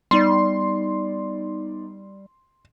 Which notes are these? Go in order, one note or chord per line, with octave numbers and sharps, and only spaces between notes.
G3 B3 D#4 D5 C6